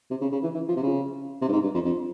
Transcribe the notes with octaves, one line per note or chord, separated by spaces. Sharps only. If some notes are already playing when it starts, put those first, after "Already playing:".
C3
C#3
C#3
E3
E3
F3
C3
C#3
C3
G2
G#2
G2
F2
F2